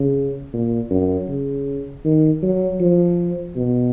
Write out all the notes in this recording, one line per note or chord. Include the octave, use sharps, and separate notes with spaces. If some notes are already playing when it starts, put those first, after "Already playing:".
Already playing: C#3
A#2
F#2
C#3
D#3
F#3
F3
B2